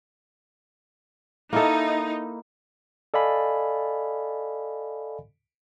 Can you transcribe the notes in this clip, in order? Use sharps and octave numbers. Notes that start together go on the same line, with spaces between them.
A#3 D#4 E4 A4
A4 D5 D#5 F5 G#5 B5